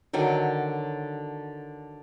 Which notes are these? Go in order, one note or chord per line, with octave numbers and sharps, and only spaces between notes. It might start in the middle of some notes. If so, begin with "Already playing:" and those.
D3 D#3 F#3